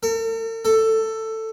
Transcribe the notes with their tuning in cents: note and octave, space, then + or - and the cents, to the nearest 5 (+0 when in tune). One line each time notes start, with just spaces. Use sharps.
A4 +45
A4 +10